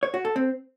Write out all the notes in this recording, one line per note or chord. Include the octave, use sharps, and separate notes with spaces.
C#5
F#4
A4
C4